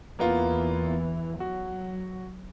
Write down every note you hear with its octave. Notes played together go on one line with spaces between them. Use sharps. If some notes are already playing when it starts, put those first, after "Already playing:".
E2 E3 A#3 B3 F4
F#3 F#4